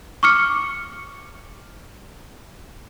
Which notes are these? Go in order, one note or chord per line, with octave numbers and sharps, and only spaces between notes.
C#6 D6 F6 C#7